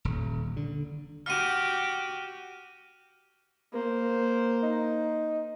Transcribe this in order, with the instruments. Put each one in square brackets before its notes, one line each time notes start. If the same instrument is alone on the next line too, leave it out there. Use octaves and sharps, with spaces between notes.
[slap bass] D#1
D3
[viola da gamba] F#4 G4 [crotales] F6 D#7
[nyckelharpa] A#3 C5
[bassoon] D#4